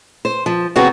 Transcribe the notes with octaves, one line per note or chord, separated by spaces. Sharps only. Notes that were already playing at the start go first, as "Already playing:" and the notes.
C5
F3
C#3 F#3 B3 C4 F#4